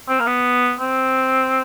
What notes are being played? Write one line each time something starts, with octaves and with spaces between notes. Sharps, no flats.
C4
A#3
B3
C4